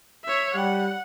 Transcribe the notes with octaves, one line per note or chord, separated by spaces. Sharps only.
C#5 E5
G3 F#5